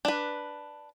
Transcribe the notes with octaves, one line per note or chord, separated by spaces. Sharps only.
D4 B4